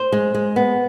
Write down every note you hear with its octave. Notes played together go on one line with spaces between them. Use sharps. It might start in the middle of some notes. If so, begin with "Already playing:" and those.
Already playing: C5
G#3
G#3
B3